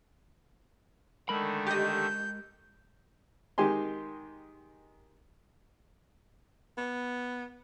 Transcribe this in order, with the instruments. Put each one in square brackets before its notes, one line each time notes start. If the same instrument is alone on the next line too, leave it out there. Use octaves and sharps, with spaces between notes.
[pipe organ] D3 D#3 A3 [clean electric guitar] G#3 A#4 B5
[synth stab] G4 D#5 [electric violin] G6
[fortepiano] D#3 G#3 G4 G#5 C6
[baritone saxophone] B3